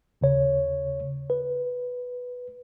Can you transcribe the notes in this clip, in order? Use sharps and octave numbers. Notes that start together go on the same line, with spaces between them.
D#2 C#3 C#5
B4